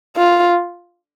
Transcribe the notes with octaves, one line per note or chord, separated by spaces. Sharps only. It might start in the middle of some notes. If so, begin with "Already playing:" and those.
F4